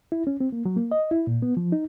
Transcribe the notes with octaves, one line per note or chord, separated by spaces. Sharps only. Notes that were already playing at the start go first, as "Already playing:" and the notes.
E4
C#4
C4
A#3
F#3
A#3
D#5
E4
A#2
B3
F3
D#4